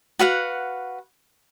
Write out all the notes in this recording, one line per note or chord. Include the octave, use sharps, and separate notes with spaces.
F#4 B4 F5 F#5